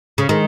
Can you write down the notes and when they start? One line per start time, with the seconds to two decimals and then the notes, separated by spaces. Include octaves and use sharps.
0.18 C#3
0.29 D#3 G#3